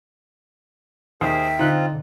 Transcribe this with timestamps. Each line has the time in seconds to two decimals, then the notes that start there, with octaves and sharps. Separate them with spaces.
1.21 D#2 G#4 A#4 C5 E5 G5
1.59 D3 C4 D#4 F4 F#6